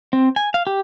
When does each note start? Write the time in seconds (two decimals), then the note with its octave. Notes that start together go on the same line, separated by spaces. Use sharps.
0.13 C4
0.36 G#5
0.54 F5
0.67 G4